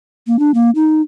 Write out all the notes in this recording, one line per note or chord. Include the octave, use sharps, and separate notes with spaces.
A#3
D4
A#3
D#4